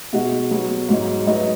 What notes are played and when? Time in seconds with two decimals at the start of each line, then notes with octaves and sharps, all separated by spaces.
0.13 B2 G#3 D#4 F#4 D#5
0.51 F#3 B3 F#4
0.89 G#2 F#3 D#4
1.27 F#3 D#4 B4 D#5